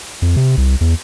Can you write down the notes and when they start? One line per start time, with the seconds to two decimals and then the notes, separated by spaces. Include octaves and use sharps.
0.22 F2
0.36 C3
0.57 C2
0.81 E2